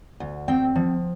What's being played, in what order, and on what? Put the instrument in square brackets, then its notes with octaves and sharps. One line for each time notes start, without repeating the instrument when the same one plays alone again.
[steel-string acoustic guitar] D2
C4 G5
F3